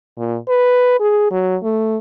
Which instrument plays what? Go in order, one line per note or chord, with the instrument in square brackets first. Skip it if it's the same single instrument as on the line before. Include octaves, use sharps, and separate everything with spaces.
[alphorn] A#2
B4
G#4
F#3
A3